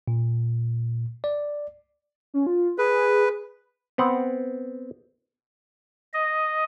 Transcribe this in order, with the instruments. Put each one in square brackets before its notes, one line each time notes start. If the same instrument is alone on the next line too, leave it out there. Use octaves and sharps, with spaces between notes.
[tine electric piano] A#2
D5
[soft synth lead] C#4
F4
[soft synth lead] G#4 [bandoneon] B4
[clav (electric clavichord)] B3 C4 F#5
[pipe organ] D#5